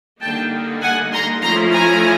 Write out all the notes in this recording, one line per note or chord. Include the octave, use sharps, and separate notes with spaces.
D3 G3 A#3 D#4 G5 A5
F#5 G#5
A#5 C6
F3 A3 C#4 E4 A#5 C6
G#5 A#5